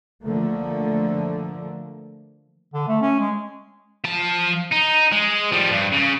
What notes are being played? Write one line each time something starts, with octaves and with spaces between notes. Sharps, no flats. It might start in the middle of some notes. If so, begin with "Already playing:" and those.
D3 F3 A3 A#3
D3
A3
C#4
G#3
F3 A5
D#4
G#3
F3 G3
G2
C#3